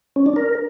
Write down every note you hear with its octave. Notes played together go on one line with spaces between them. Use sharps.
C#4
D4
A#4